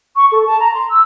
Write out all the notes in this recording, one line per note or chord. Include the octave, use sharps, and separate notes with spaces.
C#6
A4
A5
A#5
C6
E6